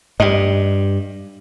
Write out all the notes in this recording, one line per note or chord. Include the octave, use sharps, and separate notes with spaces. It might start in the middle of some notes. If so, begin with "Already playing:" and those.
G2 G3 D#5